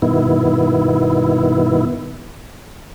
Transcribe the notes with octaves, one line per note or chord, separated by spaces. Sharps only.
G2 B2 D#3 B3 E4